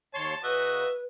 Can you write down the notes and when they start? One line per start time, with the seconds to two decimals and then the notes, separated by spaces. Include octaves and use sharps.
0.14 D#2 C#5 A5 C6
0.44 C#3 F#4 B4 D#5 E5 F#6